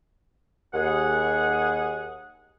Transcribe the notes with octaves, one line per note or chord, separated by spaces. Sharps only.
D#2 G#4 F#5